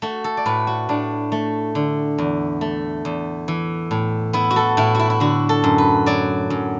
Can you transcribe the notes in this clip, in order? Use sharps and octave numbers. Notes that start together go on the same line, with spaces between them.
A3 F#4
A4
D5
A2 B4
F#4
A2 D4
A3
D3
E2
A3
E2
E3
A2
B3 E4
F#4
A4
A2 E4
E4 F#4
E4
D3 F#4
A4
F#2
B4
F#3 D5
F#2